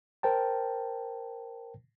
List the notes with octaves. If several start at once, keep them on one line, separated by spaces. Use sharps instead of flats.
A#4 C5 G5 A5